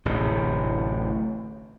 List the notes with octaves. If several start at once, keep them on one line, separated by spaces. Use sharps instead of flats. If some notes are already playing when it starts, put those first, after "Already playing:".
D1 A1 C3